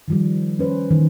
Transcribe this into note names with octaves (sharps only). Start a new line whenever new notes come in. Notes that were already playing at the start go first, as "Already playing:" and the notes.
D#3 F3 G3
C#4 B4 C5
D#3 E3